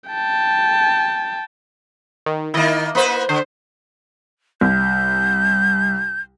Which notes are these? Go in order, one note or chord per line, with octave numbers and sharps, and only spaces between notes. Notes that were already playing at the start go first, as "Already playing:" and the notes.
G5 A5
D#3
D#3 A#3 E4 D#5
A#3 B4 C5
D3 C5
C2 G6